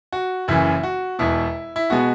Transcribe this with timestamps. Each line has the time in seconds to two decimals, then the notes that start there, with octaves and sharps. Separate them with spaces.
0.13 F#4
0.48 F#1 F#2 C#3 E3 E4
0.84 F#4
1.19 E1 E2 B2 E4
1.76 E4
1.90 B2 G#3 B3 F#4